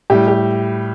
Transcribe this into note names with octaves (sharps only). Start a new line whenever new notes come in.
A2 G3 G4
G4